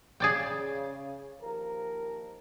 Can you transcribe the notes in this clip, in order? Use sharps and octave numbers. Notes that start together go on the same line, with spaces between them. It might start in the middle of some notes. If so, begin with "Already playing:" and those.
C#3 G#4 D5 G5
D#2 F3 A#4